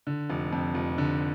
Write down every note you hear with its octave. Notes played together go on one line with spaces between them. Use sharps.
D3
F1
F2
F1
D3